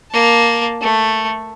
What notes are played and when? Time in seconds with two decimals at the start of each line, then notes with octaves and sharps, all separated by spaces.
0.12 A#3 A5
0.82 A3